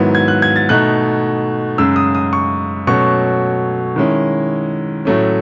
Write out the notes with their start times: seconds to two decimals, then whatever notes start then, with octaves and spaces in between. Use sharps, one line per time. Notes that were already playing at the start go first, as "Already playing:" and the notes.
Already playing: G#2 D#3 F#3 B3 E4
0.15 G#6
0.28 F#6
0.42 G#6
0.56 A6
0.69 B2 A3 D#4 F#6
1.78 F#2 C#3 G#3 E6
1.96 D#6
2.15 D#6
2.33 C#6
2.87 B2 F#3 A3 C#4 C#6
3.96 D#3 G#3 C#4 E4
5.05 A2 F#3 A3 C#4